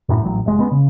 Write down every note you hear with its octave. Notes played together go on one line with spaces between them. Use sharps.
F#2 A2
A1 F#3
F1 G#3
G#3 B3 C#4
C#3